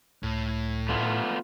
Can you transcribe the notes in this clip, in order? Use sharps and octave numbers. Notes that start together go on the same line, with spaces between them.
C#2 A2
A3 B3 F4